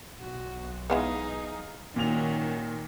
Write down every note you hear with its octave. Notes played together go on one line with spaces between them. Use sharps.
B1 F#4
E3 G#3 B3 D#4 G#4 F5
A#2 D#3 C#4 F#4 F7